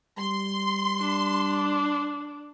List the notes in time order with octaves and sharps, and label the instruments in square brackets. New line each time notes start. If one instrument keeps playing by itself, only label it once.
[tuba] G3 [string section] C6
[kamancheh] D4